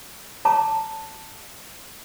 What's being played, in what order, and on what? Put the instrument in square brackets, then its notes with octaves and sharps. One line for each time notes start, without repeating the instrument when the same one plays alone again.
[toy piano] C#5 A5 A#5 D6